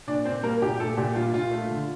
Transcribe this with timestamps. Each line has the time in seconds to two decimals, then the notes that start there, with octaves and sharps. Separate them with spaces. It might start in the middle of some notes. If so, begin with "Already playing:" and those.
0.07 A#2 D4 D5
0.25 A#2 C4 C5
0.43 G3 A#3 A#4
0.62 A#2 G4
0.80 A#2 A3 A4
0.97 A#2 G4
1.15 G3 F4
1.33 A#2 F4
1.51 A3
1.70 D3